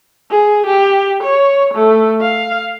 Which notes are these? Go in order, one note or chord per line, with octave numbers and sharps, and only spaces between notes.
G#4
G4
C#5
A3
F5